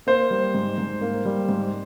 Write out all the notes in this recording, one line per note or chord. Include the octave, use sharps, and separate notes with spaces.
A#3 C5
G3
G#2
G#2
A#3
G3
G#2